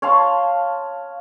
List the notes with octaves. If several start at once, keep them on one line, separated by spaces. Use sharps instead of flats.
C#5 F5 A5 C6